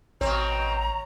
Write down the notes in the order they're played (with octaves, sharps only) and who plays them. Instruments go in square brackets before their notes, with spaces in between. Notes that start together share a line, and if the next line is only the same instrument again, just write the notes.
[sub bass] A1 [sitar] B2 C4 [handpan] C#5 [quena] A#5